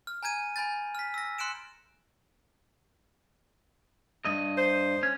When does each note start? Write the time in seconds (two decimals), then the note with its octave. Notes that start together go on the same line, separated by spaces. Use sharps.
0.07 F6
0.23 G#5 A#5 G6 G#6 D#7
0.56 G#5 B5 G6 A6
0.95 F6 B6
1.14 E6 A#6
1.38 C6 F#6 C#7 D7 E7
4.25 G2 D#5
4.58 C5
5.03 C#4